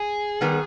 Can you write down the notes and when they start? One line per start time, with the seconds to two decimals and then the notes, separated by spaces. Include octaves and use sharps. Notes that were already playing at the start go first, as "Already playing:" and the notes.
Already playing: G#4
0.41 D#3 G3 B3